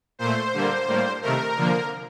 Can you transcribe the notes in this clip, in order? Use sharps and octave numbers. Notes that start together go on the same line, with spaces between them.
A#2 A3 C5
D3 G3 A#3
A2 G3 A#3
C3 D#3 A3 A#4
D3 F3 A#3